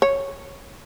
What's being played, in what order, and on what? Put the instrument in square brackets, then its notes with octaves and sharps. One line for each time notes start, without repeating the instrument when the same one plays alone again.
[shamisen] C#5